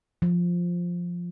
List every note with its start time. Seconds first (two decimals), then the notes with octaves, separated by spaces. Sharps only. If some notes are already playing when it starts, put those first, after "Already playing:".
0.22 F3